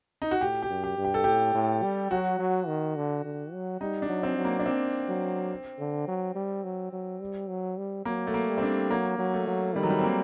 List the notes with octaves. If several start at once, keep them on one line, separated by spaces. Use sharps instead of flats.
D#4
F#4
A2 G4
G4
F#2
G4
G2
G4
A4
A2 G4
A2
G3
F#3 F#4
F#3
D#3
D3
D3
F#3
G3 D#4
D4
F#3
C4
F#3
A#3
D4
C4
F#3
D3
F#3
G3
F#3
F#3
G3
F#3
G3
F#3 A#3
A3
A#3
G3
C4
D4
F#3 A#3
F#3
A3
F#3
D#3 G3
F#3
G3
C4
A#3